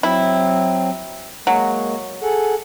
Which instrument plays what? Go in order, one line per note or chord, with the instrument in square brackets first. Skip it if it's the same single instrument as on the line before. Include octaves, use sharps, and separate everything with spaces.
[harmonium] F#3 C4 [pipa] E4
[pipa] F#3 [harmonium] G#3 A#3
[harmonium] G#4 A4 F#5